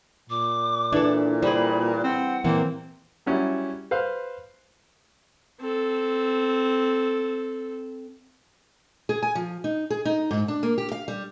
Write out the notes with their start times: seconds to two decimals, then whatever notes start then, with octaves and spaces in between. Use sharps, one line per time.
0.30 A#2 D6
0.92 E3 D4 A4
1.42 G3 G#4 C5 B5
2.04 C4 F#5
2.44 A#2 E3 A#3 C4
3.26 F#3 G3 C#4 E4
3.91 B4 C5 F5
5.61 C4 A4
9.09 G#4
9.23 G#5
9.35 F3
9.64 D#4
9.90 G#4
10.05 D#4
10.31 G#2
10.48 D4
10.63 A#3
10.78 G4
10.92 F5
11.08 G3